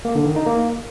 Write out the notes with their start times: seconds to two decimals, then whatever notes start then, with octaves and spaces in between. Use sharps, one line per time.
0.05 A#3
0.15 D3
0.26 D#3
0.36 D#4
0.47 A#3